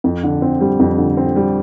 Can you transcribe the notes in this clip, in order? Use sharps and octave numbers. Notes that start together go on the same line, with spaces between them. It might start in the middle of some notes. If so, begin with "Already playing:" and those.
F2
D3
C4
G3
F2
D3
C4
G3